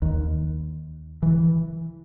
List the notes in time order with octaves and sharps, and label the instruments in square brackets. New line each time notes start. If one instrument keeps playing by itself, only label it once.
[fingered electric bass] D#2
E3